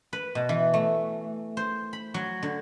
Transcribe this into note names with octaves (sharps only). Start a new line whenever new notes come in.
B4
B2
E3
A3
C5
B5
F#3
D3